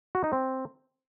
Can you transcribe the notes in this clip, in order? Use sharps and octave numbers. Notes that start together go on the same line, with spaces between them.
F#4
D#4
C4